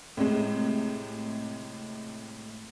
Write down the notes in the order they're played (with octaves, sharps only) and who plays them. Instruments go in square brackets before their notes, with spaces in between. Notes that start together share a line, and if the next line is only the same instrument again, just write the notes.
[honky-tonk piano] A2 C3 G#3